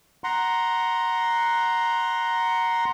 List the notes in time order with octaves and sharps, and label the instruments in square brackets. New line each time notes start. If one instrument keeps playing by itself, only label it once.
[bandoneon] F#5 A#5 C6